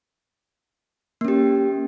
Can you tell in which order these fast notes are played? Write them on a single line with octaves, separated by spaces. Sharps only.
A#3 C#4 G4